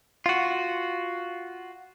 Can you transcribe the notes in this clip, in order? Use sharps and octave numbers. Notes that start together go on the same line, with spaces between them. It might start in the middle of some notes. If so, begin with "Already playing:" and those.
F4 F#4